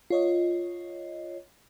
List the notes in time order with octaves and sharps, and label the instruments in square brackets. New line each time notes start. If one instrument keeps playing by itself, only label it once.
[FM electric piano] F4 C#5 D#5